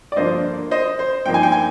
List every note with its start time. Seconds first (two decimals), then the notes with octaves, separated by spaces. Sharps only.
0.12 D5
0.16 G2 D3 F3 A#3 D4 C5 D#5
0.71 C5 D#5
0.99 C5
1.25 G2 F3 A#3 D#4 G5
1.34 G#5
1.43 G5
1.52 G#5